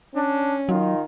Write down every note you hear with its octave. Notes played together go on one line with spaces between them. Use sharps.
C#4 D4
D#3 F#3 D#4 F4